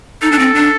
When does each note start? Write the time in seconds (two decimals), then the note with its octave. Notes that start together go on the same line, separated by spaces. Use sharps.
0.22 D#4 A4
0.32 D4
0.39 C4
0.55 D4